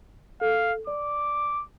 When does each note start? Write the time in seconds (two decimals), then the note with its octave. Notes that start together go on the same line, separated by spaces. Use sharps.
0.41 A4 F5
0.87 D5 D6